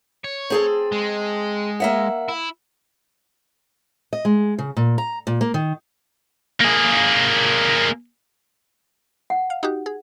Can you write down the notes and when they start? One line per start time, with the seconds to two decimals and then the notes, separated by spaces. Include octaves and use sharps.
0.24 C#5
0.50 C4 G#4 A4
0.92 G#3
1.80 A#3 E5 F#5
2.29 E4
4.13 D#5
4.25 G#3
4.58 C#3
4.77 A#2
4.98 A#5
5.27 A#2
5.41 A#3
5.54 D#3
6.61 A#3 G#4
9.30 F#5
9.50 F5
9.63 D#4 F#4 G4
9.86 G#4